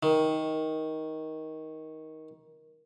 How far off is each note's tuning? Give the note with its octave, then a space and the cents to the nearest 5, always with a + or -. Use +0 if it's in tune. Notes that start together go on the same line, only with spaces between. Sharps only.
D#3 +15